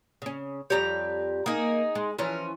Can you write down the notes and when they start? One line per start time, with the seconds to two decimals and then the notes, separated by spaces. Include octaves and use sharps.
0.22 C#3 C#4
0.70 F2 G3 G4 C#5 A#5
1.46 A#3 D#4 G#4
1.95 G#3
2.19 E3 F3 C#4 A#4